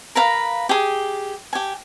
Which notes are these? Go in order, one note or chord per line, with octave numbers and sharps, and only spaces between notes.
A#4 B4 F5 A#5
G4 G#4
G4 G#5